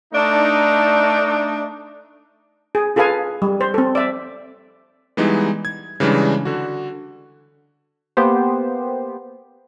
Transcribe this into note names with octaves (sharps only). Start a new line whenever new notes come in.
A3 D4 D#4
G#4
F4 G#4 A4 B4 F5 G#5
G3
C5
C4 A4
D5 E5
E3 G3 G#3 B3 D#4 E4
G#6
C#3 E3 G3 G#3 D4
D3 F#4
A#3 B3 G4 C5